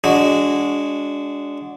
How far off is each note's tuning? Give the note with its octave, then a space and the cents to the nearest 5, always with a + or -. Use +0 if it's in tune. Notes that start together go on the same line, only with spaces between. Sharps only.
G#3 -10 D4 -25 F#4 -10